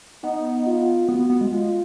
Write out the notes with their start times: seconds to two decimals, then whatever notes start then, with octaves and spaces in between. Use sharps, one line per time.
0.24 B3 D#4
0.66 F4
1.08 B3 F#4
1.19 B3
1.30 B3
1.41 G#3
1.51 G#3 F4